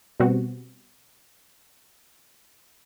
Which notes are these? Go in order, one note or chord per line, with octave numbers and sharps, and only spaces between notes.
B2 G3 B3 C4 F#4